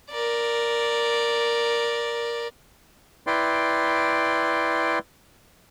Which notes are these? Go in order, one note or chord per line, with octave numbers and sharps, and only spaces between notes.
A#4 D5
E4 B4 D5 G5 C6